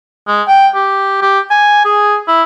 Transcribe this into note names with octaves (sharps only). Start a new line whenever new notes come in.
G#3
G5
G4
G4
G#5
G#4
E4